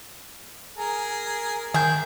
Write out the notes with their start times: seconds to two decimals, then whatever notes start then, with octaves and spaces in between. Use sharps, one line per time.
0.77 G#4 A#4
1.74 D#3 G#4 G6